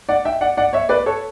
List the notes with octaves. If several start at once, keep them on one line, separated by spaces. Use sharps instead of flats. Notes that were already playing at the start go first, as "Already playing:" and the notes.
D5 F#5
E5 G5
D5 F#5
D5 F#5
C#5 E5
B4 D5
A4 C#5